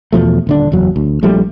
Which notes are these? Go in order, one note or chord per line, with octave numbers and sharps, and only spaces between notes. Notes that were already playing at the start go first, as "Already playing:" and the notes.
E2 B2 F3 A3
D#1 D3 D4
F#1 E2 F#3
D2
A#1 F3 G3 A3